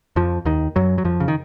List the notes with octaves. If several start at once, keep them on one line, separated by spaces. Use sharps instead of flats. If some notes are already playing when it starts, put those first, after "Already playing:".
F2 F3
D#2 D#3
F#2 F#3
F#3
F2 F3
C#3
D#3